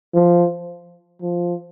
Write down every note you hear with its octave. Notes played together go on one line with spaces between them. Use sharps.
F3
F3